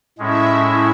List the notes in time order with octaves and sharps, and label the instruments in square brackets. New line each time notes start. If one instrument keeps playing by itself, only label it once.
[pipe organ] A2 G#3 C#4 [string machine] E4 E5